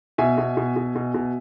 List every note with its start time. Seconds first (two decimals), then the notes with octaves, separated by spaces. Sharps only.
0.18 B2 E5 G#5
0.38 B2
0.57 B2
0.76 B2
0.95 B2
1.14 B2